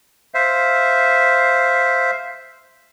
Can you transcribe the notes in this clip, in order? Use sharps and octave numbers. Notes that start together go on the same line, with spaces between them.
C5 E5 F5